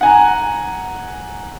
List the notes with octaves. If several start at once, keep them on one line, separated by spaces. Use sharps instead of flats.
F#5 G#5 A#5